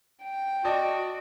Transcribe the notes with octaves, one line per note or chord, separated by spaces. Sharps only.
G5
F#4 D5 D#5 A5